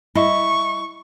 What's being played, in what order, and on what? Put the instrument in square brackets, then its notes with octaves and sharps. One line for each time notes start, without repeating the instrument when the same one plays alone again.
[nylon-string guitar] G3 E4 D#5 [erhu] C#6